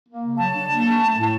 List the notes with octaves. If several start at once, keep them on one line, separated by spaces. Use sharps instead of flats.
A#3
C#3
F#3 A5
D4
A#3
C#4
A3
A2